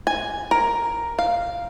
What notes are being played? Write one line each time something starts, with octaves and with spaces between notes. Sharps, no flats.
G#5
A#4
F5